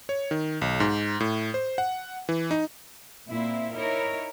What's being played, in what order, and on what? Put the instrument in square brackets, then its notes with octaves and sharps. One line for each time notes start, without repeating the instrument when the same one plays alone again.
[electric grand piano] C#5
D#3
B1
G#2
A2
C5
F#5
E3
D#4
[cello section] A#2 C4 E4 E5
D#4 E4 A#4 C#5